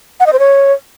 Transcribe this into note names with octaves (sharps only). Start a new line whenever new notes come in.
F#5
D#5
C5
C#5